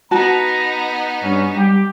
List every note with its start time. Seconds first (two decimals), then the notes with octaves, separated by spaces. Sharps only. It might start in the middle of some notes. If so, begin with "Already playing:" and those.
0.11 B3 D#4 F#4 A5 A#5
1.23 G2 C#4
1.56 G3 G4